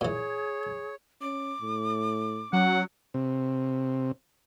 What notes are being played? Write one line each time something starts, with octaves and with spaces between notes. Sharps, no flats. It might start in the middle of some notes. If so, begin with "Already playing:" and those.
A#2 E3 G#4 C#5
C#4 D6
A2
F#3 C#4 F#5
C3